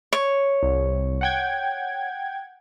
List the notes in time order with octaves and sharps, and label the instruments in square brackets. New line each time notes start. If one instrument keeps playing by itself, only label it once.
[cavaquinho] C#5
[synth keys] C2
F#5 G5 G#6